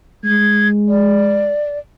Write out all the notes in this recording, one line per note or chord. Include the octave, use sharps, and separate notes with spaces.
G#3 G#6
D5